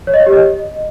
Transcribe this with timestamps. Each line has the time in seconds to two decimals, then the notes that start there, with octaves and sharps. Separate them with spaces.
0.07 C#5
0.14 D#5
0.20 C#5
0.26 G4
0.33 D#5